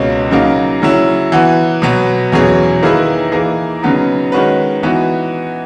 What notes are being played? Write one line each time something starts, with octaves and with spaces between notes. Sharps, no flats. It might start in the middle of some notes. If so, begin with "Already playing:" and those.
Already playing: C#2 B2 A#3 C#4
C#3 F#3 A#3 D#4
C#3 F#3 C#4 E4
E3 B3 F#4
B2 F#3 B3
E2 B2 F#3 C#4 G#4
D#3 A#3 E4 G#4 B4
E3 A#3 D#4 G#4
C#3 F#3 B3 D#4
D#3 G#3 C#4 F#4 B4
E3 B3 D#4 F#4